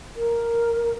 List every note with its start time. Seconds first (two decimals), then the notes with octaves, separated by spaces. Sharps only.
0.16 A#4